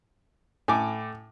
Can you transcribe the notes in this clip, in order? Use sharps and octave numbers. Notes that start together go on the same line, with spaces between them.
A2 A4 G#5 D6